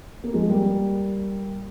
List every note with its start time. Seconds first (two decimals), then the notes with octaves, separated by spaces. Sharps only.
0.24 A#3
0.34 F3 G#3
0.49 G3 A#3
0.64 G3 A#3